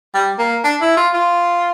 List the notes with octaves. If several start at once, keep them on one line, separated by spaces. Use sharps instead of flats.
G3
A#3
D4
E4
F4
F4